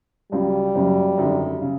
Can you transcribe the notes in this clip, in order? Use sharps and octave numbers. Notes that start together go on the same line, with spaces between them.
C#2 C#3 F#3 G3
F#1 F#2 C#3 F#3
G#1 F#2 D3
C#3